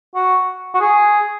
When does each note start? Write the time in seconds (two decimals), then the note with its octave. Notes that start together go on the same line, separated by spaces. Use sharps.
0.15 F#4
0.74 F#4
0.81 G#4